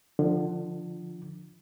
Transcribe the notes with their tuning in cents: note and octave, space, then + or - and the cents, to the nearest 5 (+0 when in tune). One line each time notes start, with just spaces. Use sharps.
D3 +25 F3 +0